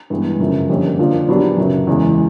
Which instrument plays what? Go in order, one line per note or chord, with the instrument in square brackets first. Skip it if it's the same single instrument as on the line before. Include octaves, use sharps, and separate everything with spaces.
[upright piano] G2 E3 G#3 B3
F#2 C#3 F3
F2 D3 G3 A#3 C#4
D3 F3 A#3 D4 F4
A#2 F#3 B3 D4 G4
F#2 C#3 F#3
E2 C#3 E3 G#3